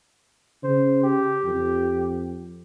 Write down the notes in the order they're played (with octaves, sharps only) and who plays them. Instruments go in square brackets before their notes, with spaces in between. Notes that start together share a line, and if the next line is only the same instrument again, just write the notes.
[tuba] C#3 [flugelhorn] C5
[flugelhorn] G4
[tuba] F2